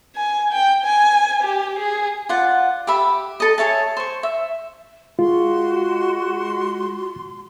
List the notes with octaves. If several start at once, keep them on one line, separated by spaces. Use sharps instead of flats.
G#5
G5
G#5
G4
G#4
F4 D5 F#5
G4 E5 B5
A4 D#5
G#4 C#5 E5 A5
C5 C#6
E5
G#3 F4 F#4 C6